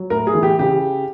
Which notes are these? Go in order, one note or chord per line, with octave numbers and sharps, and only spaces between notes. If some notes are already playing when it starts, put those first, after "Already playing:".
Already playing: F#3
A2 A#4
G#4
E3
G4
C#3 G4